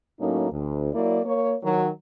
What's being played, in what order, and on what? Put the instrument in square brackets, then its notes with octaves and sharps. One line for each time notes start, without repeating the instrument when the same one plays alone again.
[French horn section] A2 F#3 A#3 C#4 D#4
D2
F#3 A#3 E4 D5
A#3 C#5
D#3 F#3